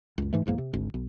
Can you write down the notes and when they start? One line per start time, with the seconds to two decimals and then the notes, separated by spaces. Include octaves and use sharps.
0.18 C#2 F#2
0.33 G#2 E3 A3
0.46 B1 E2 G#2 A#3
0.58 C3
0.73 G#1 D2
0.94 B1